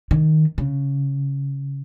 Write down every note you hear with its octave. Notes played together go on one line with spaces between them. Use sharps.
D#3
C#3